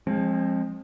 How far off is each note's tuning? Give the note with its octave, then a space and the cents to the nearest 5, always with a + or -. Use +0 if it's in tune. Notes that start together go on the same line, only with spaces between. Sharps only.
F3 +0 G#3 -10 C4 +30